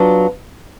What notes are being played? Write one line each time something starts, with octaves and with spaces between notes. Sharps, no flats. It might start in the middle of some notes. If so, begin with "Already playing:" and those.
Already playing: F#3 B3 D4 F4